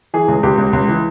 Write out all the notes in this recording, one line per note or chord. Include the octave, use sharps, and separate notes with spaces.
E3 G#4
C#2
C#2 G4
C#2
C#2
E3